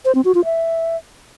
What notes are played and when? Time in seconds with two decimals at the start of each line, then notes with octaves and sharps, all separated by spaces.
0.05 C5
0.15 C4
0.25 F#4
0.35 F4
0.45 E5